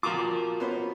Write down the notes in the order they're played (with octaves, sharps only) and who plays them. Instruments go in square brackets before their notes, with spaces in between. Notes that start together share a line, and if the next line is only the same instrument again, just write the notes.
[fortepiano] F3 D6 [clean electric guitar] F4 F#4 A#4
[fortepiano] B3 C#4 C5